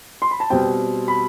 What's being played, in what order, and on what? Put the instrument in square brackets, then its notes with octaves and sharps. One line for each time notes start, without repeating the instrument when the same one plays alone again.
[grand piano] C6
B5
A5
B2 G3 C4 G5
B5